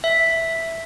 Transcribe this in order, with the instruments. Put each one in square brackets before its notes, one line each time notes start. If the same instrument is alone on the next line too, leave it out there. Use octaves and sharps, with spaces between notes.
[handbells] E5